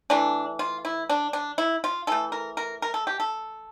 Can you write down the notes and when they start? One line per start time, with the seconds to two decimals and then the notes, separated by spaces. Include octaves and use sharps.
0.10 E3 A3 D4
0.59 F4
0.85 E4
1.09 D4
1.33 D4
1.58 E4
1.84 F4
2.07 E3 A3 A4
2.32 A#4
2.57 A#4
2.82 A#4
2.94 A4
3.07 G4
3.20 A4